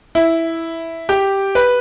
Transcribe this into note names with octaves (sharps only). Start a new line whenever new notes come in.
E4
G4
B4